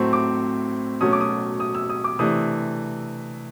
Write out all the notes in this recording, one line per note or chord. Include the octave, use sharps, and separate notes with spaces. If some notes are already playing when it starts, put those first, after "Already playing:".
Already playing: A2 F#3 A3 C4 C#6
D6
B2 F#3 A3 C#4 D#6
D6
D#6
D#6
E6
D#6
D6
C3 E3 A3 D4 D#6